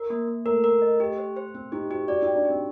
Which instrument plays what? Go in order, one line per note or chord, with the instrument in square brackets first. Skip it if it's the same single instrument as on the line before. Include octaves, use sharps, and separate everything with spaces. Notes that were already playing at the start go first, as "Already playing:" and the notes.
Already playing: [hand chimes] A#4
A#3
A#3
[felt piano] A3 [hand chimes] A#4
[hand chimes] A#4
D#5
G4
C5
C5
[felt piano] C4 [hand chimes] C5
[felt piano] D#4 [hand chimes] G4
[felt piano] F#4 [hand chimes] G4
[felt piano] F#4 [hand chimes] D5
[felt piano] D#4 [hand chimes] G5
[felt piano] D4
[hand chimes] G4
[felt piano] C4